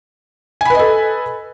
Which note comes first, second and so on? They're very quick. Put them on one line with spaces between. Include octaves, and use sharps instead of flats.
G#5 B5 B4 D#5 A4